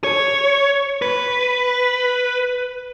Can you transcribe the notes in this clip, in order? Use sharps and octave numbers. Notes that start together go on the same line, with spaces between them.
C#5
B4